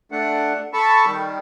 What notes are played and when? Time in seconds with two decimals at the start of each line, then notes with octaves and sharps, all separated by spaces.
0.12 A3 D4 F#5
0.73 A4 A5 B5 C#6
1.06 D#3 G3